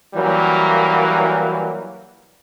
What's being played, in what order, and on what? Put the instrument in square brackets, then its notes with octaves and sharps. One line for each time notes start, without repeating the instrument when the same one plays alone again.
[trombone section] E3 F#3 G3 A#3